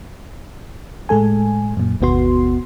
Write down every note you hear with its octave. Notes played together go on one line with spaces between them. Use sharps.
A2 G#3 A4 G#5
F#2 A#2
G1 D#2 B2 B3 F#4 C6